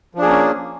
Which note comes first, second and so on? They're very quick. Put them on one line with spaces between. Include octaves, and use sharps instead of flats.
F3 D4 G#4 A#3 C#4